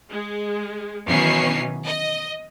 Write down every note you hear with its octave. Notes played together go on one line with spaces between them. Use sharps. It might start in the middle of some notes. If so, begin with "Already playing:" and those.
G#3
B2 D#3 E3 F#3 C#4 C7
D#5